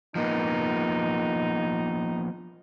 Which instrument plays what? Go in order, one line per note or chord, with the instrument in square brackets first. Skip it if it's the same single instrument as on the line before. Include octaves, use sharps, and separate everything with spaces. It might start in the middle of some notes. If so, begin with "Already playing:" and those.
[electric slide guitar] F3 A#3 B3 [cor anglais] D#4